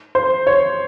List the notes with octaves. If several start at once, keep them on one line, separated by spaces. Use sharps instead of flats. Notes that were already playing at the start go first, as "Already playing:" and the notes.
C5
C#5